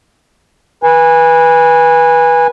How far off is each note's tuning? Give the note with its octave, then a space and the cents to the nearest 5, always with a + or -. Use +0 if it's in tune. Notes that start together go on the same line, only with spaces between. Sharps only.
B4 -20 G#5 -20